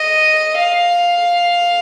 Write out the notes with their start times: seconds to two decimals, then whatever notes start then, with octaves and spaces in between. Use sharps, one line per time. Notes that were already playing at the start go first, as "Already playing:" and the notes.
Already playing: D#5
0.58 F5